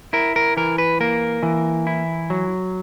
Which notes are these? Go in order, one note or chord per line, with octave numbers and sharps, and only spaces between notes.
E4 A#4
A#4
E3 A#4
B4
A#3 A#4
E3
E4
F#3